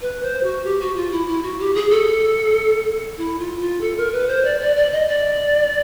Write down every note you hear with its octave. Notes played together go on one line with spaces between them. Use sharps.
B4
C5
F#4
G4
F#4
F4
E4
E4
F#4
G4
G#4
A4
E4
F4
F4
A4
A#4
B4
C5
D5
D5
D5
D#5
D5